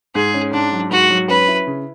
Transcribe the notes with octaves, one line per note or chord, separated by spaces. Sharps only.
G#2 G#4
C#4
G#2 D4
F#3
G#2 F#4
F#3
C#4 B4
E4
C#3